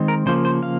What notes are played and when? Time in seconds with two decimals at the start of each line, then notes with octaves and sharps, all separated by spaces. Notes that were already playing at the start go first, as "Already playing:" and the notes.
Already playing: D#3 G#3 C4
0.08 A#4
0.26 C#3 F3 A#3 C5
0.45 C5
0.63 F5